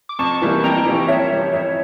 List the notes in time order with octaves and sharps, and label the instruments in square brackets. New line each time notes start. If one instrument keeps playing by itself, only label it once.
[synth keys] D6
[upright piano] F2 [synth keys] A5 C#6
[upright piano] E3 G3 A#3
[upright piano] F2 [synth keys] G5 A#5
[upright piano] E3 G3 A#3
[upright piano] F2 [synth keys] C#5 E5
[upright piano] E3 G3
[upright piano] F2 [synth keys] C#5 E5